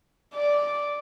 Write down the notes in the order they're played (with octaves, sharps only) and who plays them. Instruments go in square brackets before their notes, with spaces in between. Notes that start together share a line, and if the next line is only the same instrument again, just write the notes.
[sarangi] D5